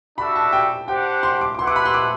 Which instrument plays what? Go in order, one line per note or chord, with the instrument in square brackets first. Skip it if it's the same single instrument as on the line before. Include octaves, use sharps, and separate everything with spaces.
[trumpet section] G3 D4 F#4 A4 E5 [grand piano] B5
[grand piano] A5
G5
[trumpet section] D4 G4 C5 F#5 [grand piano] G5
[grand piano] C6
D6
D6
[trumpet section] A3 E4 B4 F#5 [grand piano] C6
[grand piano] D6
B5
C6
D6